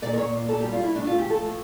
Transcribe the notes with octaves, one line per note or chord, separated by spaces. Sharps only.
A#2 D5
A#4
A#2 C#5
A#2
A#2 A4
G4
G3
F4
G3 E4
A2 D4
F4
A3
G4
F3 A4
A2